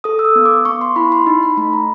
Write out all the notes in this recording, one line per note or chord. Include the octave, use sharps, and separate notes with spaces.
A4 D#6
E6
D#6
B3
D6
B3 C#6
C6
E4 B5
C6
D#4 B5
B5
A3 B5
A#5